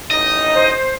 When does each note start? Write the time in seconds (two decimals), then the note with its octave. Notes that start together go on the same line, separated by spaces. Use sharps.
0.11 A1 D#4 D#5
0.55 C5